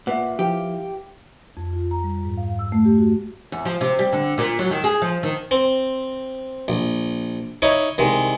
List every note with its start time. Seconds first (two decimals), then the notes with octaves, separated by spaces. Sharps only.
0.07 A#2 B4 E5 F#5
0.39 F3 E4 G4 F5
1.57 F2
1.73 F4
1.91 A#5
2.03 G3
2.25 G#2
2.37 F5
2.59 E6
2.72 A3
2.85 G4
2.98 F#4
3.52 E2
3.65 F3
3.81 C3
3.99 G3
4.13 D3
4.38 A#2
4.59 F#3
4.71 D#3
4.84 G#4
5.02 F3
5.23 D#3
5.51 C4
6.68 A#1
7.62 D#4 E4 C#5
7.98 C2 D#3 G#3